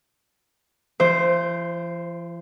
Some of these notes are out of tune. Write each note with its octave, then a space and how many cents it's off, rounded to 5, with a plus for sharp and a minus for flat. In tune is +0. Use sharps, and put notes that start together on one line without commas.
F3 -45 C5 +0